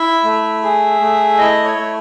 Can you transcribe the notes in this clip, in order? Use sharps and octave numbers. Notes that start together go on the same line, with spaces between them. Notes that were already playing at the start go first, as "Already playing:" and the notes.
Already playing: E4 E5
A3
G#4
A3
E4 D#5
C#5
A3